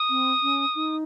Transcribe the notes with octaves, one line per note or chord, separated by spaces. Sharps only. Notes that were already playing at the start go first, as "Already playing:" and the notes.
Already playing: D#6
C4
C#4
D#4